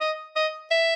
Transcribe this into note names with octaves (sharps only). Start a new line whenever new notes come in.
D#5
D#5
E5